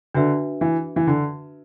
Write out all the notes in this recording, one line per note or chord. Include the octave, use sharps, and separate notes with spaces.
D3 D4 F#4 B4 E5
E3
E3
D3